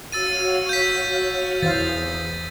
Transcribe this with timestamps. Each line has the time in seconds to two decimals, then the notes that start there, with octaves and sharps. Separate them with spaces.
0.12 F#4 C#5 F5 E6 A6 D#7
0.69 G6 B6
1.63 E2 E3 C5 F5 D#6 A6